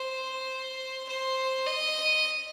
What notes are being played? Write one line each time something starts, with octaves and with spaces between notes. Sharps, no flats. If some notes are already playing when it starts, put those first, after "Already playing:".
Already playing: C5
C5
D#5